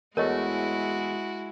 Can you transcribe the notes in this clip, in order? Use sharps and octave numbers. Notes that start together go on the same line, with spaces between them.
E2 G#3 A3 E4 F#4 A#4 C#5 D#5